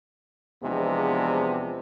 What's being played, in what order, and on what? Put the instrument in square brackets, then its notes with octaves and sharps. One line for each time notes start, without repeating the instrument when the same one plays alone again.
[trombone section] E2 C3 F3 G#3 B3 D4